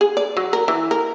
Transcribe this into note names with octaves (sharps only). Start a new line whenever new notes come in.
G#4
D5
F#3
A#4
E3
A#4